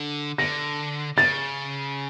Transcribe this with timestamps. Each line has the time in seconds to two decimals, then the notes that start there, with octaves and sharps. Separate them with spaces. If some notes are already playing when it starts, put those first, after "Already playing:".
Already playing: D3
0.38 D3 A#6
1.17 C#3 A6